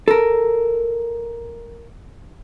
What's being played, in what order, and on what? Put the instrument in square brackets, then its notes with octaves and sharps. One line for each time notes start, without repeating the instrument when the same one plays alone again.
[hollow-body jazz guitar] A4 A#4